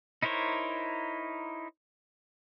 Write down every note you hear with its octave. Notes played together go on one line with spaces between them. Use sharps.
D#4 E4 A#4 C5 C#5